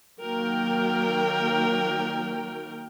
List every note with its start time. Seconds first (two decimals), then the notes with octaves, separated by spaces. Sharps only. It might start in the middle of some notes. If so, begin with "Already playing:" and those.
0.20 D#3 F#3 A#3 A#4 G5